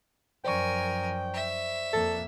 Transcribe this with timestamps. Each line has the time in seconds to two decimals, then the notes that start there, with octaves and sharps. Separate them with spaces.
0.45 F#2 F3 A#4 C5 D5 G5 G#5 C#6
1.34 E5
1.93 F2 A#3 A4